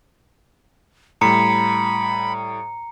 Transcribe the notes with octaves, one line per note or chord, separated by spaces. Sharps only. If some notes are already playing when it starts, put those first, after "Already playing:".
A2 G3 A#5 B5 C#7